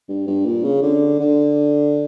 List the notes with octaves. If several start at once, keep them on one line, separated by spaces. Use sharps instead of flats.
G2
G2
A#2
C#3
D3
D3